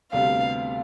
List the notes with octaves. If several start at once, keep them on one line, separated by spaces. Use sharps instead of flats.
D2 C3 G3 B3 F5